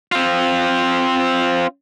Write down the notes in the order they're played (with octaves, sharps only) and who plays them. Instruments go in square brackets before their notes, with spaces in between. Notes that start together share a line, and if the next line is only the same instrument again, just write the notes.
[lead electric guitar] C4 F4